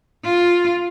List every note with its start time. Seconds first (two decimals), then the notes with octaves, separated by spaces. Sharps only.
0.24 F4